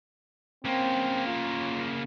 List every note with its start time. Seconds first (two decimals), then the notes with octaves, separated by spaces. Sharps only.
0.65 C#3 A#3 C4
1.26 F4